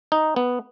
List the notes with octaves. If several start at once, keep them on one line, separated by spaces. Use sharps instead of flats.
D#4
B3